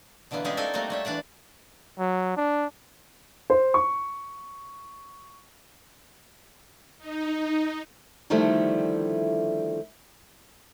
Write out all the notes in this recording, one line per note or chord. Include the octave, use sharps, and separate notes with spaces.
B2 D3 E3 A#3 B3
G3 G#3 C#4 E4 F4 G#4
C4 D#4 F4 A4 A#4 G#5
G3 A3 A#3 C4 F#4
G3 C#5 E5
E3 D4 D5 F#5
F#3
D4
C5
C#6
D#4
D3 D#3 F3 G3 A3 E4